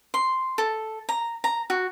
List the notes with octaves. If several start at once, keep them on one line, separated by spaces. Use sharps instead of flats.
C6
A4
A#5
A#5
F#4